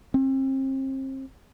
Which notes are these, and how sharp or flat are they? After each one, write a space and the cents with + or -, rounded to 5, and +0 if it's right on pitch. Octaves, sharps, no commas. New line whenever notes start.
C4 +35